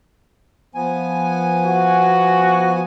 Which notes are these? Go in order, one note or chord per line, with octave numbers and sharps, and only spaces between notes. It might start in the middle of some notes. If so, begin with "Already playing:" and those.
F3 B3 G#5
F#4